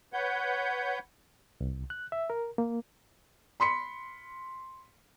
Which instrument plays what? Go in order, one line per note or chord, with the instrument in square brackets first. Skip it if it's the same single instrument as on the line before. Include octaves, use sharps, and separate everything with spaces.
[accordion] B4 C#5 F#5 G6
[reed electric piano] C2
F#6
E5
A#4
A#3
[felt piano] B5 C6 B6 C#7